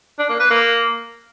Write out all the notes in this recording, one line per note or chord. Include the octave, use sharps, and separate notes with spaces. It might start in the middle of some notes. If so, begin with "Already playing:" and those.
D4
A#3
B4
A#3